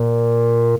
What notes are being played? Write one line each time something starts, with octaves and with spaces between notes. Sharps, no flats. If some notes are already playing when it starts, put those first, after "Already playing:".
Already playing: A#2